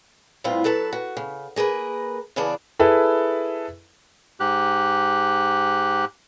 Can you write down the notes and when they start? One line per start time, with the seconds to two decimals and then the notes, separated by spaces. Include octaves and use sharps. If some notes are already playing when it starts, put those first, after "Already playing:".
0.44 A2 G3 B3 C4 F4
0.64 F#3 A4 B4 A5
0.93 F#4
1.17 C#3
1.56 A#3 G#4 A#4 B4
2.36 C#3 E3 B3 G#4 D5 A5
2.79 E4 G#4 A4 B4
4.40 G#2 G4 F#6